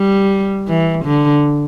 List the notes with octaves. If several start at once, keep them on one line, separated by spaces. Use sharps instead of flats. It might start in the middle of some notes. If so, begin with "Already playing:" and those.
Already playing: G3
E3
D3